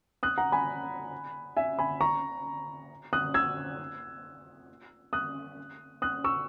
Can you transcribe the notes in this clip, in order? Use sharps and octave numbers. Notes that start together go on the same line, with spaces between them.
D#6 F#6
F#5 A#5
G#5 B5
E5 G#5
G#5 B5
A#5 C#6
D#6 F#6
E6 G#6
D#6 F#6
D#6 F#6
C#6 E6